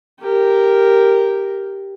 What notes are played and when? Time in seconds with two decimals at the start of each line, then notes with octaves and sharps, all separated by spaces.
0.20 G4 A#4